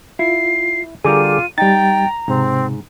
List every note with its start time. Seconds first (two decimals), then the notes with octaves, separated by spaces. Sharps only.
0.19 E4 F4 C7
1.05 D3 G3 F4 G#4 A#4 D6 D#7
1.58 G3 D#4 G5 A#5 A6
2.28 G#2 C3 C4